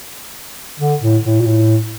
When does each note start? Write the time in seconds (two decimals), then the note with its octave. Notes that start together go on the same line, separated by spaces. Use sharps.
0.80 D3
1.02 A2
1.24 A2
1.40 A#2
1.46 A2